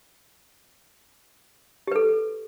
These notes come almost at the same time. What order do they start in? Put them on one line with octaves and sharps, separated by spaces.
G4 B4 A4